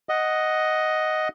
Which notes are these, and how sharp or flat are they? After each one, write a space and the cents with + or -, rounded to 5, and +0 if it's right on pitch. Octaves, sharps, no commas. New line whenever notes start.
D#5 +5 F#5 +0